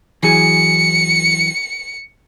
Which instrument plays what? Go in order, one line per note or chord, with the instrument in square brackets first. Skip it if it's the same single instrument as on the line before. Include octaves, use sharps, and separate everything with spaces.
[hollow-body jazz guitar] E3 F#3 G#4 [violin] C#7